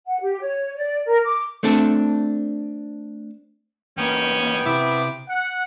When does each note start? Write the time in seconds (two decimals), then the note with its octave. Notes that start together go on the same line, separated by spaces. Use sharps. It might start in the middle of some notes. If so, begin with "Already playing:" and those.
0.06 F#5
0.20 G4
0.40 C#5
0.75 D5
1.05 A#4
1.24 D6
1.63 A3 C4 D4 A4
3.97 E2 A#3 B3 C#4 G5
4.66 C3 E4 D6
5.28 F#5